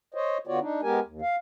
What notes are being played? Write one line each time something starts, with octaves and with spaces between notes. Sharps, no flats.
C5 C#5 D#5
D3 B3 F4 F#4 C#5 D5
D4 D#4
G#3 B3 G4 A#4 G#5
D#2
F5